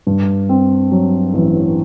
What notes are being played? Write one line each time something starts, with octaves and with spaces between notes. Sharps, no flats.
G2
C4
F#3
A1